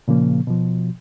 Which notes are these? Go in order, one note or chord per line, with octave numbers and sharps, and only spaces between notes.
A#2 C#3 F3 A#3
B2 F3